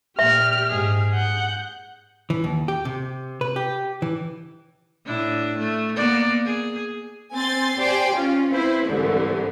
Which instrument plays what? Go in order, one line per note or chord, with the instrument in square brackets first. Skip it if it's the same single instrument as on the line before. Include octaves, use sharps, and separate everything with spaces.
[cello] A#2 [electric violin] G4 F6 [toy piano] E5
[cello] G#2 G#4
[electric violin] F#5 G6
[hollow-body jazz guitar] E3
D#2
G4
C3
B4
G4
E3
[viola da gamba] A2 D4 E4
A3
A#3 B3 D5
G#4
[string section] C4 G#5 C6 A6
G4 C5 D5 G5 G#5
C#4 F4
C4 E4 B4 C5
C2 G#2 D3 E3